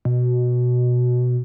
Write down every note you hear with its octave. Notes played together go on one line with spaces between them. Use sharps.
B2